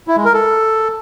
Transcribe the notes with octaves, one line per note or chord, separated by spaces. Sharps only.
E4
G#3
A#4
A4